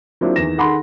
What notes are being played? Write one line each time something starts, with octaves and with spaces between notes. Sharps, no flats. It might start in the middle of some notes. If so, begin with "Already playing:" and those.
F#3 A#3 C4 D4 E4 F4
E2 D#3 E3 A#6 E7
D#3 G#4 A4 F#5 B5 C6